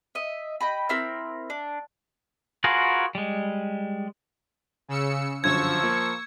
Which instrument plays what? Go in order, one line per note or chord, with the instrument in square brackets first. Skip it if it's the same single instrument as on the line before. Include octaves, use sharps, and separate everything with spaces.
[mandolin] D#5 E5
D#5 G5 B5
C4 E4 A#4 E6
D4
[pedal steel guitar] F4 F#4 G#4 A#4 B4
G3 G#3
[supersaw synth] C#3 E6 C#7
[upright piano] G1 F#2 D3 [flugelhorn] F3 [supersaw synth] C#6 E6 C#7 [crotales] G#6
[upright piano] A#3